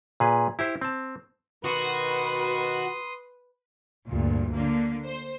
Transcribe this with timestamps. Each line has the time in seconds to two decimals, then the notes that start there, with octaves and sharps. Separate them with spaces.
0.20 A#2 G#4 B4
0.59 E4 G4 C5
0.81 C4 A5
1.65 B2 D#3 F#4 B4 C6 D#6
4.08 D2 G2 A#2
4.54 D3 A#3
5.05 C5